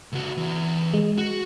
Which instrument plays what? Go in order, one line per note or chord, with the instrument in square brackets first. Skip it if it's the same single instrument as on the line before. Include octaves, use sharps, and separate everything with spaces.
[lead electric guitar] C#2 F#4
E3 D5
[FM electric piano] G#3
[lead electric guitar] F#4